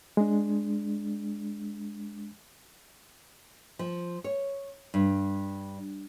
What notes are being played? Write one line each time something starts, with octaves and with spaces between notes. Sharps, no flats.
G#3 D4
F3
C#5
G2